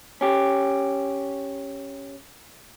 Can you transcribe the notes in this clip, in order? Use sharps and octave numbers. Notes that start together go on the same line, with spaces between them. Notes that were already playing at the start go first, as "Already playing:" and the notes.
C#4 G4